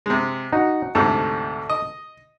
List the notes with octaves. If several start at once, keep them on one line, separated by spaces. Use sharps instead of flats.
C3 G#3
D#4 F#4
D2 G#2 C3 A4
D#5